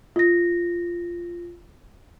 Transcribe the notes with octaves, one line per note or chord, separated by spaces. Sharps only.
F4 A#6